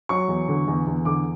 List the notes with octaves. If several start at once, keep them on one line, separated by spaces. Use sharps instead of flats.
F#3 C#6
E2
D3
E2
E2
D3 D6